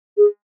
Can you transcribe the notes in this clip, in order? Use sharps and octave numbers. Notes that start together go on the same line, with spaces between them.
G#4